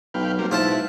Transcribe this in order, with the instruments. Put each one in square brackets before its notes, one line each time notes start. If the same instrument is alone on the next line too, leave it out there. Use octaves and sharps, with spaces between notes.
[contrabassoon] B1 [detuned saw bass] F#3 [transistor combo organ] B4 F5 G5
[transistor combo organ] G3 A#3 C4
[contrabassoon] G#2 [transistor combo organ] B2 E4 [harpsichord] F4 C5 A5